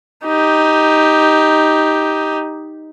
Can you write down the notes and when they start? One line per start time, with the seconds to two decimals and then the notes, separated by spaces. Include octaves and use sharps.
0.24 D#4 G4